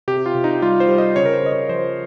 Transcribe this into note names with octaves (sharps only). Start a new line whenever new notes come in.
C3 G4
F4
C3
D#4
G3 F4
C5
G3
D#5
C#3 C#5
A#4
C5
C#3 D#5
C#5
F3 C5